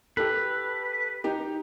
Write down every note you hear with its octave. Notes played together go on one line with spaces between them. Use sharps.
G4 A4 B4
D#4 G4